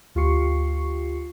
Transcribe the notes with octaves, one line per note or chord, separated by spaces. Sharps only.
D2 F4 G4 C#6 C7 C#7